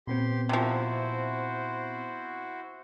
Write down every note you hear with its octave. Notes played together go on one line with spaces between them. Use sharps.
A#2 B3 C4 G4 C6
C3 F3 E4 F#4 C5